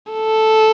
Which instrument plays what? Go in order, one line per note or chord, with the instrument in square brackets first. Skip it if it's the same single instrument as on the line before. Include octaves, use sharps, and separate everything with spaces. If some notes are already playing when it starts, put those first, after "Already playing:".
[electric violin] A4